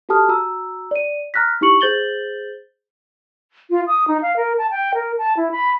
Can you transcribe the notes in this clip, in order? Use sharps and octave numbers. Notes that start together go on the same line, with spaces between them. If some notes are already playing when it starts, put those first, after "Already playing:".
F#4 G4 A4 A5 D#6 F6
F#4 A#5 E6
D5 D#7
A#5 F6 F#6 A#6 B6
D#4 E4 G4 C#6 C#7 F#7
G#4 C5 G6 A6 F#7 G7
F4
D#6
D#4
F5
A#4
A5
G5
A#4
A5
E4
B5